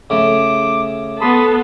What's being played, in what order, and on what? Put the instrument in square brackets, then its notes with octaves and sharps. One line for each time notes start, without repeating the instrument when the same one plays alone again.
[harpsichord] C#3 A3 [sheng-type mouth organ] D6
[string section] B3 A4 [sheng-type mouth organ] B5 C6 D#6